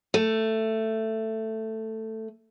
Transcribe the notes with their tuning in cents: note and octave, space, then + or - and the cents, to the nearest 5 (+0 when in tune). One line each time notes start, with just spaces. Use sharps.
A3 +10